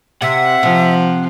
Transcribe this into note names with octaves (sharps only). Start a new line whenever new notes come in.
C3 E5 F#5
C3 F3